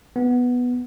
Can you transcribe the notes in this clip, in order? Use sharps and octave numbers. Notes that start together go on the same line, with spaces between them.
B3